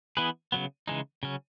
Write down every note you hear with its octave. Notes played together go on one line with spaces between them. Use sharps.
E3 B3 E4 G#4 B4
C#3 F#3 B3
C#3 E3 G#3 D#4
C#3 F#3 C#4